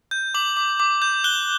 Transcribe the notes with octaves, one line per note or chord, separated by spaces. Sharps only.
G6
D6 F#7
D6
D6
G6
F#6 G7